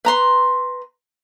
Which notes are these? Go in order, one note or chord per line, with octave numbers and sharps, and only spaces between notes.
B4 A#5 C6